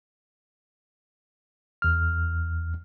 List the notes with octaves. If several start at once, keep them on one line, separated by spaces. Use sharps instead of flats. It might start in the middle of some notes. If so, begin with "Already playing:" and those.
E2 F6